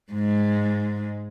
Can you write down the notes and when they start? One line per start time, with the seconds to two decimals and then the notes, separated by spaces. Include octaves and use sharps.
0.12 G#2 G#3